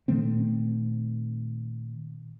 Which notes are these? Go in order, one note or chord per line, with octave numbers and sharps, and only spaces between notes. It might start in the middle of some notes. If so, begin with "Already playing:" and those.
A#2 D#3 A3 C4